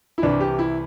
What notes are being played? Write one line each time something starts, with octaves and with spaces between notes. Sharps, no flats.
E4
C2 C3 E3 D4
G4
E4